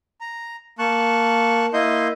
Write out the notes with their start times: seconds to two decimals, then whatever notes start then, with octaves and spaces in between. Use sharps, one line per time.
0.21 A#5
0.79 A#3 A5 C#6 F#6
1.73 A#3 E4 D#5 C6 G6